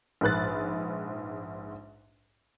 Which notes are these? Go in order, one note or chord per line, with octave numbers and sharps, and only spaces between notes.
A#1 G#2 B4 F#6 A6